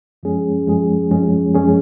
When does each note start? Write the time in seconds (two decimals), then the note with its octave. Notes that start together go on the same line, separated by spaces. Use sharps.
0.23 F#2 F3 G#3 C#4 G#4
0.67 F#2 F3 G#3 C#4 G#4
1.11 F#2 F3 G#3 C#4 G#4
1.54 F#2 F3 G#3 C#4 G#4